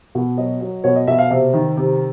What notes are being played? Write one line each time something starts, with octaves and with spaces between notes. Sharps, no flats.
B2
F#3 D#5
F#3
B2 C#5
D#5
B2 E5
F5
C3 E5
D#3
C3